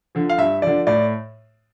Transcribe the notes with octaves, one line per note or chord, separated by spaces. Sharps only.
D3 F3
F5
G2 E5
D3 F3 D5
A2 D5